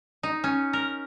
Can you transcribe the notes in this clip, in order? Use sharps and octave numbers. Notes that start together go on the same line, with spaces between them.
D#4
C#4
A#4